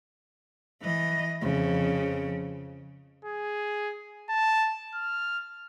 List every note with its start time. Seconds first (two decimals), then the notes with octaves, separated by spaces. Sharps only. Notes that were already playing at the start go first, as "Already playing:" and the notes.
0.82 E3 D#5
1.41 F2 C#3
3.25 G#4
4.30 A5
4.94 F6